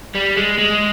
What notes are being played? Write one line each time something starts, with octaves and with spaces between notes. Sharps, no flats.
G3
G#3
G#3